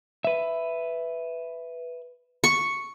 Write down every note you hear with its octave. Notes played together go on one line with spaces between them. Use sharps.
B4 E5
C#6